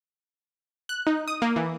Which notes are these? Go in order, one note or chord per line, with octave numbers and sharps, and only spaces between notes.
F#6
D#4
D#6
A#3
E3